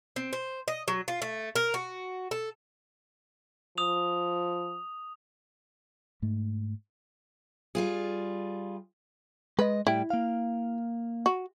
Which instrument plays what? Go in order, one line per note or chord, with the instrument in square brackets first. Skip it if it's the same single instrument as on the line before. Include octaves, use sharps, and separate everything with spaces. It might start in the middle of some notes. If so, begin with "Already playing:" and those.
[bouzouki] C4
C5
D#5
F#3
F4
A3
A#4
F#4
A4
[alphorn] F3 [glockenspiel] D#6 F7
[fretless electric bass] G#2 A3
[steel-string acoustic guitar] G3 F4 G#4
[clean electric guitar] G#3 D#5 [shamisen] B4
[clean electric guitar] A2 G3 G5 [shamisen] E4
[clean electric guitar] A#3 F5
[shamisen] F#4